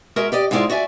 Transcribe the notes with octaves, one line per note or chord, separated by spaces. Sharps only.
G#3 F#4 A#4 D#5 E5
G4 D5 D#5
G#2 G3 G#3 E4 F4 D5
F#4 D5 E5 G#5